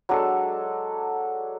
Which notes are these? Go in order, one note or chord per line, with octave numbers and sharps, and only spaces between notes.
F#3 G#3 D4 A4